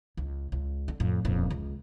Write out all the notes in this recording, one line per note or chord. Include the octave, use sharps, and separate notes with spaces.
C#2
C#2
D3
F2 A2
D#1 F2
C#2